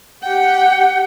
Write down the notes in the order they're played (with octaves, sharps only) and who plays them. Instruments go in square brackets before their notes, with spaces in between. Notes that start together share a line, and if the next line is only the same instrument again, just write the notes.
[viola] G4 G5 [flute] F#5